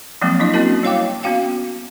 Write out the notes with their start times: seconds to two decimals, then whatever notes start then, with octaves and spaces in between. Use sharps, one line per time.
0.22 F3 F#3 G#3 A#3 C4
0.40 F#3 D4 E4 D#5
0.54 A#3 C4 C#4 E4 F#4 A#4
0.83 G3 E4 C#5 F5 G5 D6
1.23 B3 C#4 F#4 F5 G5